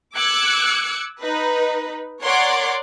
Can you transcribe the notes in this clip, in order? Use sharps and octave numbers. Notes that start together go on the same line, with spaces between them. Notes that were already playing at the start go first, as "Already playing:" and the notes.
D6 E6 F#6 G#6 C#7
D#4 B4
A#4 C#5 D5 F#5 C6 D6